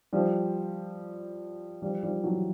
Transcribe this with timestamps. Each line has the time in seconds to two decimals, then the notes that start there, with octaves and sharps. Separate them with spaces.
0.13 F3 G3
1.82 F3 G3
2.03 F3 G3
2.24 E3 F#3